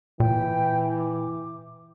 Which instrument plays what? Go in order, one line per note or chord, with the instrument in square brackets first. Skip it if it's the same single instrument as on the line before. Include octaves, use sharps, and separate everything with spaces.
[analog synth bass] A#2 [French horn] E3 [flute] G5
[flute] D6